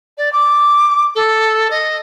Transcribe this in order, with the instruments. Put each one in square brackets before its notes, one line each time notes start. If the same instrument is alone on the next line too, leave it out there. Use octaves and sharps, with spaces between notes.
[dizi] D5
D6
A4
D#5